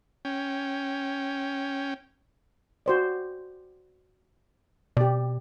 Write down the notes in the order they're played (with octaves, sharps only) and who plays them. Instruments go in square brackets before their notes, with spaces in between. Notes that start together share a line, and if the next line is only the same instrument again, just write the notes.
[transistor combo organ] C#4 G5
[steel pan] F#4 C5 D5
[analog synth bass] B2 [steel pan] G4 D5